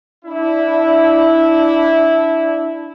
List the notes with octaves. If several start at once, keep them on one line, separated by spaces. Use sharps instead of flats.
D4 E4